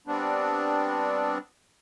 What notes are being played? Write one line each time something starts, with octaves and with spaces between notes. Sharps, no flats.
G3 B3 C4 D4